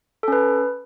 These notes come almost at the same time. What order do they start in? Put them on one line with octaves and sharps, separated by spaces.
A4 C#4 B4